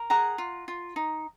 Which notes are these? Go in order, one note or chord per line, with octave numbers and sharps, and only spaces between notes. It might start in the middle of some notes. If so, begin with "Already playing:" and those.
Already playing: A#4
G#4 F#5 A#5
F4
F4
D#4